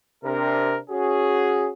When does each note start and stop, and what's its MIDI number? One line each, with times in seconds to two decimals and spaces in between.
0.24 0.79 48
0.24 0.79 62
0.24 0.79 70
0.90 1.70 61
0.90 1.70 66
0.90 1.70 68